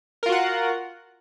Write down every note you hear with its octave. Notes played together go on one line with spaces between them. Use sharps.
F4 F#4 A#4 F#5